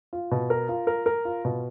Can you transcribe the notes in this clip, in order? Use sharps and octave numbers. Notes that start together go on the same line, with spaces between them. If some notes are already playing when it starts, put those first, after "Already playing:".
F4
B2
A#4
F4
A#4
A#4
F4
B2